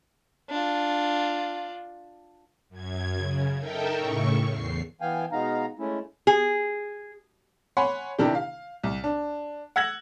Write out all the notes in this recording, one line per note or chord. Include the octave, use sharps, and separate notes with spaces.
D4 F4
F#2 G#6
C#3
D#4 A4 A#4 E5 G5
A2 C#3 C#6
E2 C7
E3 B3 F5 G5 G#5
B2 G#3 B3 D#4 F5 A#5
G#3 A3 C#4 E4
G#4
C#5 F#5 G#5 B5 C6
C3 D#3 D4 E4 G4
F5
C2
D4
F#5 E6 G#6 A#6 F#7